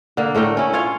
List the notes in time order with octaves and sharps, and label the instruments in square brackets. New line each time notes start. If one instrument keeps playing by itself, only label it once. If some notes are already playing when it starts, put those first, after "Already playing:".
[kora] D3 A#3
A2 A3 A#4 G5
C#4 E4
F4 C#5 F5